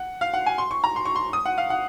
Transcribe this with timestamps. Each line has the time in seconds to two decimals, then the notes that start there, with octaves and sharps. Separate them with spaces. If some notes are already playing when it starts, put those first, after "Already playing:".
Already playing: F#5
0.21 F5
0.34 F#5
0.46 G#5
0.58 C6
0.71 C#6
0.84 A#5
0.96 C6
1.05 C#6
1.16 C6
1.33 D#6
1.46 F#5
1.58 F5
1.70 F#5